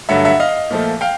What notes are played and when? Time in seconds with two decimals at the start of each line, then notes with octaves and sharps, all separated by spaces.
0.09 G2 D3 F#3 A3 E5 F#5
0.25 E5 F#5
0.40 D#5 F5
0.70 A#2 F3 A3
1.01 F5 G5